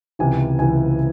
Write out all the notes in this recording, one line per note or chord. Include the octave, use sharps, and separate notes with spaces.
C#2 C3 E3 G#5
C#2 C3 E3 G#5